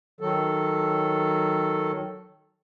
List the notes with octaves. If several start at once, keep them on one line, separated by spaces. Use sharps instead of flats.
D#3 F#3 A4